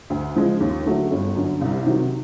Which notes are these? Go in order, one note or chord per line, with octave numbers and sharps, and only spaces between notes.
D2
C#3 F3 G#3
D#2
D3 F#3 A3
G1
F#2 D3
C2
C3 D#3 F#3